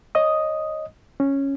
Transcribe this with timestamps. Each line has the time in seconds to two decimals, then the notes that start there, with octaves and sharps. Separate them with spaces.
0.15 C#5 D#5 D#6
1.20 C#4